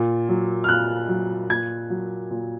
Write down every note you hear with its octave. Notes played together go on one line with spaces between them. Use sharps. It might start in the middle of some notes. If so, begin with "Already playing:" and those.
Already playing: A#2
F#3
F6
A#2 F#6
F#3
A#2 G#6
F#3
A#2